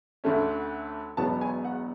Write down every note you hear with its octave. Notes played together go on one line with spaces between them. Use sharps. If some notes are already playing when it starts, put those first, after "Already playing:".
D2 D3 A3 C#4
E1 E2 B2 F#3 B3 A5
G#5
F#5